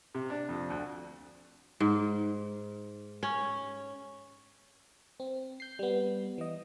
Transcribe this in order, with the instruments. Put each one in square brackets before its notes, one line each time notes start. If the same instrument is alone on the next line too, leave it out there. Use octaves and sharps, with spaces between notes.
[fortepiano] C3
D4
F2
D2
[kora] G#2
C#4
[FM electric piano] C4
G6 C7
G3 B3
E3 D#5